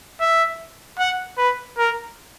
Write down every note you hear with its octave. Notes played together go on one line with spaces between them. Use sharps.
E5
F#5
B4
A#4